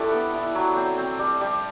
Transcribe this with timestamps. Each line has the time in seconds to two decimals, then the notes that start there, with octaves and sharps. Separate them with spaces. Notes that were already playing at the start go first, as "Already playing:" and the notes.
Already playing: A3 D4 E4 G4 A4 B4
0.12 B3
0.33 E4
0.55 F#3
0.76 C4
0.98 C4
1.19 G3
1.41 G3